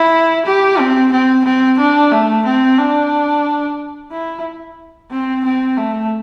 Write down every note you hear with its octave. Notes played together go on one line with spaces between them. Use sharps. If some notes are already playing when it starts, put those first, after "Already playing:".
Already playing: E4
G4
C4
C4
C4
D4
A3
C4
D4
E4
C4
C4
A3